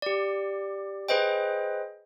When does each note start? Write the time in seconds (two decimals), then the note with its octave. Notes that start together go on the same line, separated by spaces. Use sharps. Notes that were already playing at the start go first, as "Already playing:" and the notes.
0.02 G4 D5
1.09 G#4 B4 C5 D#5 G5